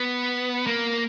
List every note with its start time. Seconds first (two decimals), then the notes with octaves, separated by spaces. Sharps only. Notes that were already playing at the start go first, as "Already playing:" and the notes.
Already playing: B3
0.67 A#3